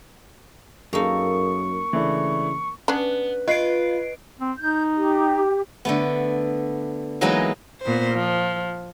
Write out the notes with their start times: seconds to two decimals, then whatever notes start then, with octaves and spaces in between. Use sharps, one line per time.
0.93 F#2 A#3 D#4 G#4 A4 C#6
1.93 C#3 E3 A3 D4
2.88 B3 C#4 D4
3.48 F4 B4 D#5 C7 D7
4.40 C4
4.58 D#4 G6
4.96 G4
5.85 D3 A3 B3
7.21 E3 F#3 G#3 A#3 B3 D#4
7.83 A#2 B3 C5
8.12 F3